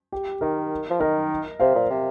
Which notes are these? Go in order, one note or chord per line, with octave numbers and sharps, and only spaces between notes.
G4
D#3 A#4
F3
D#3 A#4 D#5
C3 C5 F5
A#2
C3